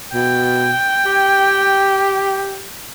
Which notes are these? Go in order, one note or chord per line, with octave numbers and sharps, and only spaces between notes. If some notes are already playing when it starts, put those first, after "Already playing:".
B2 G5
G4